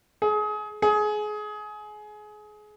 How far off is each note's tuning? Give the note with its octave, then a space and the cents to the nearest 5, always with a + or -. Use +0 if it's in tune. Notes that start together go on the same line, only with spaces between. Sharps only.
G#4 +30
G#4 +25